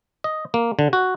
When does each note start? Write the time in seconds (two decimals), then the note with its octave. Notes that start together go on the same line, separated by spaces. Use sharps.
0.24 D#5
0.54 A#3
0.79 D3
0.93 F#4